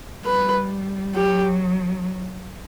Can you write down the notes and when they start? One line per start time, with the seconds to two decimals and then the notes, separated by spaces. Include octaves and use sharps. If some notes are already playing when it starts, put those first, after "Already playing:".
0.25 G3 B4
1.14 F#3 G4